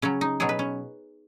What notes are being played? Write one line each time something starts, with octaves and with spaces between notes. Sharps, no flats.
C#3 F#3 C#4
D#4
B2 F#3 G#4
B4
C#4